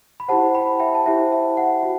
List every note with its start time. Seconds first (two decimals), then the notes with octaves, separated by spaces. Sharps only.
0.20 B5
0.28 E4 G4 C5 F#5 A5
0.55 G5 B5
0.80 E5 G5
0.95 A5
1.06 E4 G4 C5 E5 G5
1.32 E5
1.57 F#5
1.83 F#4